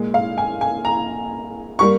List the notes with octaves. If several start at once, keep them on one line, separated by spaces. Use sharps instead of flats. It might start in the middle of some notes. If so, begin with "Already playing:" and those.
Already playing: A#2 G#3
F5
G#5
G#5
A#5
G3 A#3 C#6